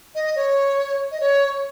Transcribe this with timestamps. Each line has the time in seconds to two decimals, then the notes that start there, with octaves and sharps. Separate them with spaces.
0.15 D#5
0.36 C#5
1.12 D#5
1.20 C#5